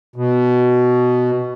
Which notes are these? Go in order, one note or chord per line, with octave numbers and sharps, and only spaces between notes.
B2